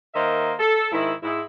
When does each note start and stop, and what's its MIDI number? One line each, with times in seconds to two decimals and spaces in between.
0.14 0.53 51
0.14 0.53 58
0.14 0.53 72
0.14 0.53 75
0.14 0.53 76
0.59 0.89 69
0.92 1.12 44
0.92 1.12 51
0.92 1.12 64
1.23 1.41 44
1.23 1.41 64